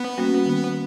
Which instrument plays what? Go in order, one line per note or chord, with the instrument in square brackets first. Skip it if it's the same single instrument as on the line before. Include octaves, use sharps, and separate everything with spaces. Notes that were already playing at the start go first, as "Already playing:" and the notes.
Already playing: [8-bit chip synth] B3
[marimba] G3 A#3 C#4 F#4
D#3